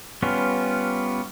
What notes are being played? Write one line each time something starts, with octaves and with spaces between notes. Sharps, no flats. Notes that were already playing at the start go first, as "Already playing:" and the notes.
G3 B3 C#4 F4